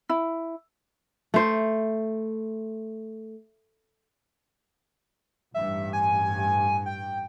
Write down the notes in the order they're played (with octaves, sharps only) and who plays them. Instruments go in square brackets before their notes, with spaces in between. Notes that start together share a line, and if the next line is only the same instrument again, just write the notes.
[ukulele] E4
[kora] A3 C5
[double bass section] A1 G2 [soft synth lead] E5
[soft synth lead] G#5
G5